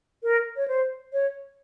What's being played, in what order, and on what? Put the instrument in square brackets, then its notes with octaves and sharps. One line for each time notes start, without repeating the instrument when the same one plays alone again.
[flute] A#4
C#5
C5
C#5